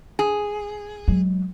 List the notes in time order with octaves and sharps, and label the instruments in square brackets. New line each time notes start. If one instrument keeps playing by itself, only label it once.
[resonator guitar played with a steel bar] G#4
[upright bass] F#3 G#3